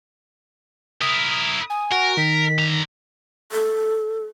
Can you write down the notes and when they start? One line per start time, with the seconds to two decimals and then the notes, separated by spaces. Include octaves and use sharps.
1.01 E4 A#4 D#6
1.70 G#5
1.92 F#4 A#4
2.17 D#3 B6
2.58 D3 A#5
3.52 A4